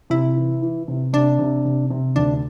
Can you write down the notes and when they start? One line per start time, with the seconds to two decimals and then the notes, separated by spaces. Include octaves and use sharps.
0.10 C3 E4
0.36 E3
0.62 E3
0.88 C3
1.13 C3 D4
1.39 C3
1.65 C3
1.90 C3
2.16 D2 D4